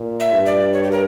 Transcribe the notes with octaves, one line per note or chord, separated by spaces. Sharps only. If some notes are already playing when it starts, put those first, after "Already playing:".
Already playing: A#2
E5
G2
D5
C#5
G4
A#4